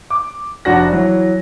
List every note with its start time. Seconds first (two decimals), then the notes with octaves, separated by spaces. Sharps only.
0.10 D6
0.65 F1 D4 F#4 F#5 A#6
0.92 E3 F#3